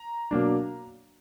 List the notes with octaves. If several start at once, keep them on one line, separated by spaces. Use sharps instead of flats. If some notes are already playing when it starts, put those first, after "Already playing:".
Already playing: A#5
B2 F#3 A#3 D4